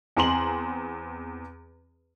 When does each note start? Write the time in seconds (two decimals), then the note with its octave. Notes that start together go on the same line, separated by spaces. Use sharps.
0.16 E2 C4 A#5 C6 F#7